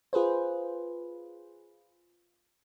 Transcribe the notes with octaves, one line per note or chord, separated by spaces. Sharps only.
F4 G#4 B4 C5